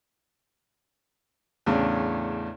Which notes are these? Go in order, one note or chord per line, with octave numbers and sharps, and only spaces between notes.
E2 A2 C#3 C#4 D4